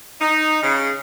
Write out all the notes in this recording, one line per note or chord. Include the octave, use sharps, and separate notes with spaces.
D#4
C#3